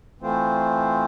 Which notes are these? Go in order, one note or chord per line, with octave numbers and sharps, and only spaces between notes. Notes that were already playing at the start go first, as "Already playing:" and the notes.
E3 A3 C4 F4 C5